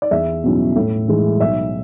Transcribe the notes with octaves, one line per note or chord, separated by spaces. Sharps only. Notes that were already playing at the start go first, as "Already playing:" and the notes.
D5
E2 E5
B2 F#3 C#4 E4
A2
E3 G#3
B1 E5